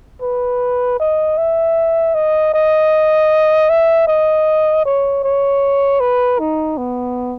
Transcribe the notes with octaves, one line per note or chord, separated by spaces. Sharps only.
B4
D#5
E5
D#5
D#5
E5
D#5
C#5
C#5
B4
D#4
B3